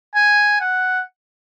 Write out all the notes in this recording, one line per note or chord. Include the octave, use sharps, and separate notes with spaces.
G#5
F#5